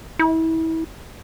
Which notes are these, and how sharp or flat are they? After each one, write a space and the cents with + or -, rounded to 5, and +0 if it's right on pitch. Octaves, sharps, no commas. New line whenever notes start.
E4 -30